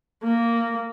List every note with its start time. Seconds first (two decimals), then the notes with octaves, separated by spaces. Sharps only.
0.23 A#3